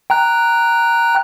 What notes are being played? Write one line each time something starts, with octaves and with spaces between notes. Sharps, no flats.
G5 A#5 F#6